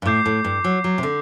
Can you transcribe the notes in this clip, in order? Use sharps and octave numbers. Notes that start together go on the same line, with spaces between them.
G2
A2 D6 G6 C7
A2
G2
F#3
F#3
C3
D3